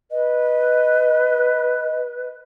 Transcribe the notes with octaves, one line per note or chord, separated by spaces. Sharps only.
B4 D#5